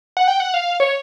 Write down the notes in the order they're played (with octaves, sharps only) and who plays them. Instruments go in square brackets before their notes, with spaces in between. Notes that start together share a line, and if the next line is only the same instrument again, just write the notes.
[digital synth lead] F#5
G5
F#5
F5
C#5